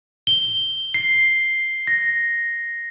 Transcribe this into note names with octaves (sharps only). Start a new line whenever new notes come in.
G7
C7
A#6